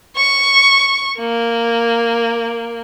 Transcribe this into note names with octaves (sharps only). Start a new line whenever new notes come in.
C#6
A#3